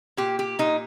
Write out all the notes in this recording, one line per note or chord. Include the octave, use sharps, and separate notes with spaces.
A#2 G4
G4
A#2 D#4